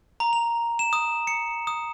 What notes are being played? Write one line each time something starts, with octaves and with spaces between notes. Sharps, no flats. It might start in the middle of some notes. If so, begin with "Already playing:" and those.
A#5
F7
E7
D#6
C#7
D#6